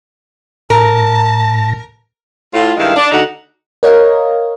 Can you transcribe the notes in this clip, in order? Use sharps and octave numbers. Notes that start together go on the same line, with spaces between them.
A2 A#4 A5 A#6
A2 F4
G2 D#3 G#3 E4 F5
D4
D2 D3 D#4 F#4 F#5
A#4 C#5 D#5 F5